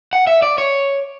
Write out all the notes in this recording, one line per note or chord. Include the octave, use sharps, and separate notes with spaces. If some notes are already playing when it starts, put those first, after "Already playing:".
F#5
E5
D5
C#5